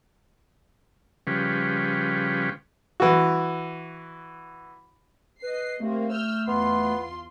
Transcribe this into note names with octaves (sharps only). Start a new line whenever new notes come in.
C#3 F3 G3 C#4 B4
E3 F#4
B4 D#5 C7
C3 A3 A#3 C4
E6 F6 G6
E2 B3 F4 C6